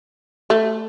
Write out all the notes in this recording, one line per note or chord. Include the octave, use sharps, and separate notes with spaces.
A3